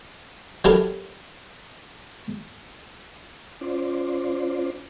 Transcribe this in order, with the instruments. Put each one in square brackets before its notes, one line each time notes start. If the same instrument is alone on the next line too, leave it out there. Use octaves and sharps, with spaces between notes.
[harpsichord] F#3 D4 E4 G4 A4 A#4
[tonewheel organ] C#4 F4 C5 D5